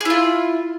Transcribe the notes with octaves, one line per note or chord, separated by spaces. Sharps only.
E4 F4 G#4